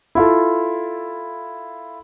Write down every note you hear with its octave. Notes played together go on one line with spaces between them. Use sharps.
E4 F4 A4